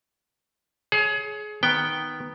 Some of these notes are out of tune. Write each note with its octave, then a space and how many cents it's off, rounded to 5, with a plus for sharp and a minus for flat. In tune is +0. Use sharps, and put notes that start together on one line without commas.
G#4 +25 C#5 +0
D#3 +0 B3 +0 G5 +0